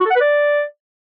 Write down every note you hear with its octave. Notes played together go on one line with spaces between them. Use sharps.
F#4
A4
F#5
B4
D5